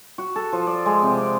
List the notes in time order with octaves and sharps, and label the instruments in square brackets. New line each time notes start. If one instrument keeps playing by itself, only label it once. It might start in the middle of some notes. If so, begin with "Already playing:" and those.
[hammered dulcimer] F#4
A4
F3
D5
G#3
C3
D5